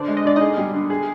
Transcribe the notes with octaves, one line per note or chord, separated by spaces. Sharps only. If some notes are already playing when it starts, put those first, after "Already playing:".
Already playing: D3 D4 C5 D5
G#3
D#5
D3 D5
D#4 G#4 D#5
G3
D3
G#4